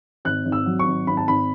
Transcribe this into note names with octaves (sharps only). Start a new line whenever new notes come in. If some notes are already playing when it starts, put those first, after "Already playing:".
G#1 F#6
G#1
E6
F#3
C#6
G#1
G#1 B5
A5
G#1 B5